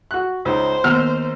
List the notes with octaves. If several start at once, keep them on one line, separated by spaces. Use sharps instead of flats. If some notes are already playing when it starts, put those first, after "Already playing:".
F#4 F#6
C#2 D#4 C5
D#2 B3 E6 F6